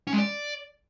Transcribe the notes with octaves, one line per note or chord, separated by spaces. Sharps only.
C#4
G#3
D5